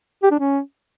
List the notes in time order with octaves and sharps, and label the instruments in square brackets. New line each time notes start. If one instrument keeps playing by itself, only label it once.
[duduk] G4
D4
C#4